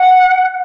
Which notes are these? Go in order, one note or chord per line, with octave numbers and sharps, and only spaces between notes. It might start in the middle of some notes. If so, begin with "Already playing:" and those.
Already playing: F#5